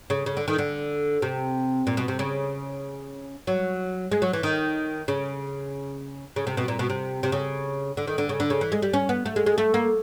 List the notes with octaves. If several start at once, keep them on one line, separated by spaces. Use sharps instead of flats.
C#3
C#3
D3
D#3
D3
C3
A#2
B2
C3
C#3
F#3
G#3
F#3
E3
D#3
C#3
C#3
C3
B2
A#2
B2
C3
C3
C#3
D3
D#3
D3
C#3
D3
C#3
E3
G#3
G3
C#4
B3
A3
G#3
G#3
A3
A#3